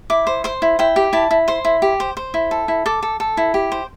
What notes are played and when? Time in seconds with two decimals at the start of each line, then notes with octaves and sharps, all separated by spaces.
0.10 E4 D6
0.27 C5
0.44 C5 C6
0.62 E4
0.79 E4 G5
0.96 G4
1.13 E4 A5
1.31 E4
1.48 C5 C6
1.65 E4
1.82 G4
2.00 C5
2.17 C5
2.34 E4
2.51 A4
2.68 E4
2.86 A4 D6
3.03 A4
3.20 A4
3.37 E4
3.54 G4
3.72 C5